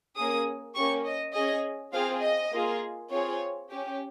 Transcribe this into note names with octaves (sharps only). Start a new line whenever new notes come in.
A#3 C#4 G#4 D#6
A#3 C#4 G4 C#6
D#5
C#4 G#4 D#5
C4 F4 G#4 F5
D#5
A#3 F4 G#4
C4 F4 G#4 C#5
C#4 G4